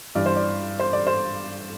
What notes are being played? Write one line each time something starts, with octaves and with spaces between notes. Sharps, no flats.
G2 E3 D5
C5
D5
C5
D5
C5